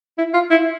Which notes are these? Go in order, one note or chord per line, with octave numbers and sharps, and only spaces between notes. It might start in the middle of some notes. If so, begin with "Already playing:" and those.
E4
F4
E4